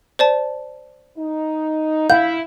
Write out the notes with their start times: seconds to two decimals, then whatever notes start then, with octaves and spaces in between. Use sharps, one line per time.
0.19 C5 D5 A5
1.18 D#4
2.10 E4 F5 G6